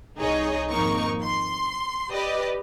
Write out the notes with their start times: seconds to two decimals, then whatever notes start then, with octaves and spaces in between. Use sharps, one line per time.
0.17 C2 D#4 G#4 C#5 D#5
0.70 G#1 F2 A#3 D#4 A#4 C#6
1.24 C6
2.11 G4 B4 D5 D#5